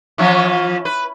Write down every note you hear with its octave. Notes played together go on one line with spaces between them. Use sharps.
E3 F3 C#4
B4